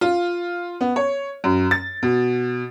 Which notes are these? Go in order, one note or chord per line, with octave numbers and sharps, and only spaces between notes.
F4
B3
C#5
F#2
A6
B2